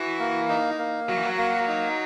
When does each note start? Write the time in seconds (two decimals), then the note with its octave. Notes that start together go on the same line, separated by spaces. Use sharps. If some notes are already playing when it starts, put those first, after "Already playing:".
Already playing: E3 F#4
0.19 A#3
0.49 D#4
0.79 A#3
1.08 F#3 F#4
1.16 E3
1.23 F#3
1.38 A#3
1.68 D#4